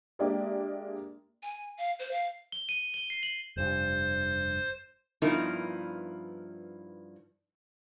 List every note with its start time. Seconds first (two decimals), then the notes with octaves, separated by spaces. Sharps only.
0.19 G#3 A#3 D4 G4 D5 E5
1.43 G#5
1.78 F5
1.99 C5
2.11 F5
2.52 G7
2.69 D#7
2.94 G7
3.10 C7
3.23 F#7
3.56 F1 G2 C5
5.22 G2 F3 B3 D#4 E4 A#4